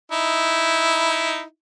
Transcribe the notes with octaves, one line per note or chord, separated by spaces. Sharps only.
D#4 E4